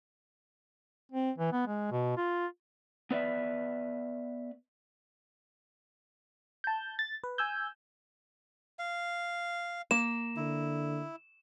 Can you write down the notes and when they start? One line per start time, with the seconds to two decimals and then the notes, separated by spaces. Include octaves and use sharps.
1.12 C4
1.38 E3
1.52 B3
1.67 G#3
1.92 B2
2.17 F4
3.11 B3 B4 D5 E5
6.64 A5 G6
6.99 A6
7.24 B4
7.38 G#5 E6 G6
8.79 F5
9.91 A#3 E7
10.37 D3 E4